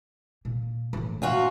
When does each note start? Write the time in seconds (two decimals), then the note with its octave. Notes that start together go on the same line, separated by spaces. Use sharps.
0.45 A#2
0.93 A2 E3
1.22 D2 A#2 F4 F#4